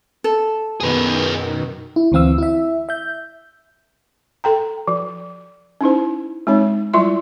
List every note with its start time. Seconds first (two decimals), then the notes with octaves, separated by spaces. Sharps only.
0.24 A4
0.80 F#2 B2 D#3 G#4 B4
1.96 E4
2.12 D2 E3 C4 F5 E6
2.38 E4 E5
2.89 E5 G6
4.44 A4 G5 A#5
4.88 F3
5.81 C#4 D#4 E4 C5
6.47 G#3 C4 D#4 C#5
6.94 F#3 G3 E4 F4 E5 C6